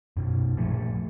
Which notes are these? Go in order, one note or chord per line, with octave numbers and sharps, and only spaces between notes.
F#2 B2
A#2 F3 A3